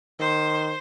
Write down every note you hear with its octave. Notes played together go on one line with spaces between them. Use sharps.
D#3 C5